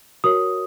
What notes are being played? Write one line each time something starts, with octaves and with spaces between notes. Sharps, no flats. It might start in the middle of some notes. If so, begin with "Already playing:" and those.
F#4 A#4 C#5 D#6